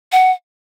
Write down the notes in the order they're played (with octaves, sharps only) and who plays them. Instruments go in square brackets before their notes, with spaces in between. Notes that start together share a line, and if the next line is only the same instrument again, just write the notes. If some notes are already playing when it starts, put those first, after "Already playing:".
[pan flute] F#5